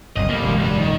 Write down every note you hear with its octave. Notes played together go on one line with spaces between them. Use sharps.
F#1 C2 F#2 D#5
A2 G3 A#3
E1 C#2 F#2
G3 D4
D#3